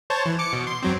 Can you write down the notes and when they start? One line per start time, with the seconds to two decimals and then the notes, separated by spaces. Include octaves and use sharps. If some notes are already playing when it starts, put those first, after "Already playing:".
0.10 C5 C#5 A5
0.25 E3
0.39 D6 C#7
0.53 B2
0.67 C6
0.82 F#2 F#3 C4